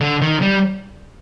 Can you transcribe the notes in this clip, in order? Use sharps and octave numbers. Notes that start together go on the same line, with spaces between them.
D3
D#3
G3